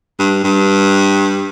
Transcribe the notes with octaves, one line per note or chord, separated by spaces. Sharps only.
G2
G2